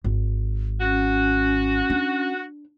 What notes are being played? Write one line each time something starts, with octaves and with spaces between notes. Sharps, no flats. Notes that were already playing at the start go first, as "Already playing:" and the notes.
G#1
C#4 F#4
D4